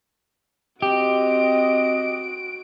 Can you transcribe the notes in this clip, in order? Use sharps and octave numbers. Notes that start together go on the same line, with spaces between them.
C4 F#4 G4 D#5 D7